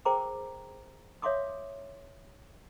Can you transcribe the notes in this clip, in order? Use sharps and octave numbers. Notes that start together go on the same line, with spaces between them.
G#4 A#4 C5 G5 A#5 D6
C#5 E5 F5 C6 D6 D#6